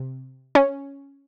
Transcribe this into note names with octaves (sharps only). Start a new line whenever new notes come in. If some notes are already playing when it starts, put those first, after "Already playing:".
Already playing: C3
C#4